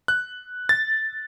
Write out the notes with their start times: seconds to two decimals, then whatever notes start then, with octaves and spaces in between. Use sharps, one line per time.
0.08 F#6
0.69 A6